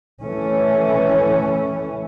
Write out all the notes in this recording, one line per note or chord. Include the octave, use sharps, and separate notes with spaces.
E3 A3 C#4